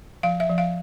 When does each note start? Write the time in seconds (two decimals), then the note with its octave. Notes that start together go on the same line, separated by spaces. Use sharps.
0.23 F3 F5
0.40 E5
0.49 F3
0.58 F5